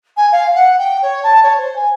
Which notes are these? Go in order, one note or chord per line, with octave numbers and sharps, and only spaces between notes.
G#5
F5
F#5
G5
C#5
A5
C#5
C5
G#5